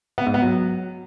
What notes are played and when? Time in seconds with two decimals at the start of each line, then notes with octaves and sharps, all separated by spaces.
0.18 B3
0.26 G#2
0.34 B3
0.42 F#3